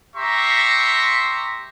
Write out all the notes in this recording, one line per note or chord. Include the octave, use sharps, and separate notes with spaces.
G4 E5 A#5 C6 C#6